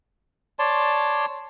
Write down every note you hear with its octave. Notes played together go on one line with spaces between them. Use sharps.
C#5 D5 A5 C6